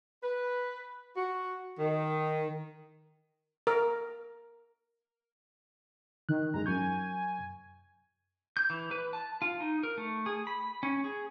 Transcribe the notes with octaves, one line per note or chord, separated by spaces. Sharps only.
B4
F#4
D#3
A#4
D#3 F#6
F#2 G#3 D#4 A#5
F#2 G#5 C#6 G6
G6
E3
B4
A5
F4
D#4
A#4
A3
G#4
B5
C#4
G#4